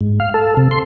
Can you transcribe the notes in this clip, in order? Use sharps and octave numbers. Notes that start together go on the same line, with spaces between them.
G#2
F5
A4
C3
C6